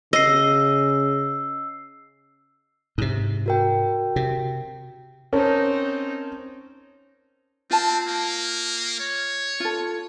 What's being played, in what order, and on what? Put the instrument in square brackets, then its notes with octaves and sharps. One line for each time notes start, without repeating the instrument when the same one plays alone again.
[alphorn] C#3 [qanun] D#5 [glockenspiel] E6 C7
[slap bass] G#2 C3
[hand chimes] F#4 A#4 G5
[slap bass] C3
[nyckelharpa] C4 D#4 [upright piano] C#4 [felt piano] A#4 A5
[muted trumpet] C4 [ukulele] F4 A5
[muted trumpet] A#3
C#5
[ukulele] F4 A4